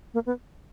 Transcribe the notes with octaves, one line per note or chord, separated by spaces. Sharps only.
A#3
B3